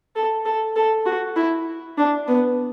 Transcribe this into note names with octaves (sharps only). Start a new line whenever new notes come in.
A4
A4
A4
F#4
E4
D4
B3